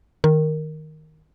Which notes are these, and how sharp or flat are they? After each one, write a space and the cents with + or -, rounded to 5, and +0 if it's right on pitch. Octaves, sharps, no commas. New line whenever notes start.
D#3 +0 A#4 +0